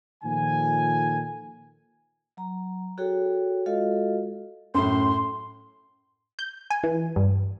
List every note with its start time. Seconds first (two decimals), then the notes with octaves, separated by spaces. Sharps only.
0.23 A#2 D#3 F3 A4 G#5
2.37 F#3 A#5
2.98 F#4 G#4 A4 C#5 G5
3.66 G#3 F4 F#4 A4 D#5 F5
4.75 F#2 A2 C6
6.39 G6
6.70 G#5
6.83 E3
7.16 G2